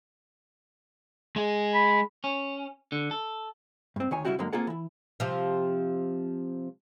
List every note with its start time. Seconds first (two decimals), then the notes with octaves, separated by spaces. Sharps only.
1.36 G#3 G#4
1.74 B5
2.24 C#4
2.92 D3
3.11 A4
3.96 G2 C4
4.11 D2 D#3 C#5 G#5
4.25 C#3 G3 C#4 E4 F#4 G4
4.39 G2 D3 F#3 G#3 A#3
4.52 A#3 C4 F4 G#4 A4 F#5
4.67 E3 E4
5.20 C3 F3